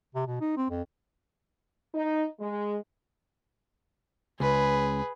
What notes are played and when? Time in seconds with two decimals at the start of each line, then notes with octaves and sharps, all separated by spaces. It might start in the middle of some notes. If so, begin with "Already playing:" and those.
0.15 C3
0.27 B2
0.41 D#4
0.57 C4
0.70 F2
1.95 D#4
2.40 G#3
4.40 C#2 G#4 B4